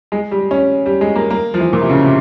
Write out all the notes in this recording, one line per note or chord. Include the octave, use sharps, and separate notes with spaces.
G#3
G3
C#4
G3
G#3
A#3
A#3
F3
E3
A#2
C3
C#3
C3